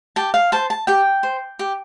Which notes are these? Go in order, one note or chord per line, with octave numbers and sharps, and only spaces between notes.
G4 A5
F5
C5 A5
A5
G4 G5
C5
G4